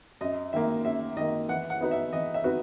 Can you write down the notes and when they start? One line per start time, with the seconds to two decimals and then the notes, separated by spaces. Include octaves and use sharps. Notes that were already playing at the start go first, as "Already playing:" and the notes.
0.21 F#2 D#5
0.53 D#3 A#3 E5
0.85 F#2 E5
1.17 D#3 A#3 D#5
1.49 E3 F#5
1.70 F#5
1.81 B3 D#4 F#4 B4
1.91 E5
2.12 E3 D#5
2.34 E5
2.44 B3 D#4 F#4 B4